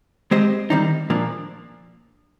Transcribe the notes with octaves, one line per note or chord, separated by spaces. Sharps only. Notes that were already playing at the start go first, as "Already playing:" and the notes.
G#3 C4 G4 C5 D#5
D#3 G3 C4 D#4
A#2 F3 A#3 D4